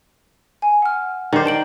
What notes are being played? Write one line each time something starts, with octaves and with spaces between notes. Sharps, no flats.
G#5
F#5 F6
D#3 C5 D5 D6
A5 D7 F#7